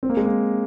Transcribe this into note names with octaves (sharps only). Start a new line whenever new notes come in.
C4
A#3
G#3
A#3